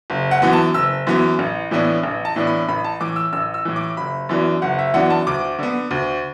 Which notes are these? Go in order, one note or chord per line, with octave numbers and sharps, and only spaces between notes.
F#1
F#5
F#2 E3 B3
A5
F#1 E6
F#2 E3 B3
A1
A2 E3 B3 D4
A1
A5
A2 E3 B3 D4
B5
A1 B5
A5
A2 E3 D6
E6
A1 E6
E6
A2 E3
D6
F#1 B5
F#2 E3 B3 D4
F#1 F#5
E5
F#2 E3 B3 D4 F#5
A5
D2 D6
D3 B3
D2